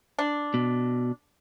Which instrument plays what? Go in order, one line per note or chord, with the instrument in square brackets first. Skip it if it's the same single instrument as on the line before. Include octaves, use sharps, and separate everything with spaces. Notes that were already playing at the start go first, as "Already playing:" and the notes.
[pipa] D4
[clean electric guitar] B2